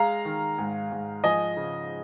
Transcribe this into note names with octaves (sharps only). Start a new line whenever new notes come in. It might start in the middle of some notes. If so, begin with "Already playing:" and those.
Already playing: G#3 F5 A#5
D#3
G#2
G#2
F3 D#5 G#5
C#3